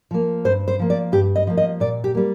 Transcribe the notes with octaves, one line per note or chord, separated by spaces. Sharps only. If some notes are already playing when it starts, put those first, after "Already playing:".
F3 A#3
G2 C5
C5
F3 A#3
D5
G2 G4
D#5
F3 A#3
D#5
A#2 D5
G4
G3 A#3